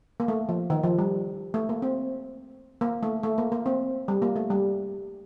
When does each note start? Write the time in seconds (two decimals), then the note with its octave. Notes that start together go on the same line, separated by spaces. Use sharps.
0.20 A#3
0.28 A3
0.49 F3
0.70 D#3
0.83 F3
0.99 G3
1.54 A3
1.69 A#3
1.82 C4
2.81 A#3
3.03 A3
3.23 A3
3.38 A#3
3.52 A#3
3.66 C4
4.08 G3
4.22 A#3
4.36 A3
4.50 G3